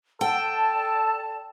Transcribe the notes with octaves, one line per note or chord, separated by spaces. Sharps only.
A4 D5 G5 A5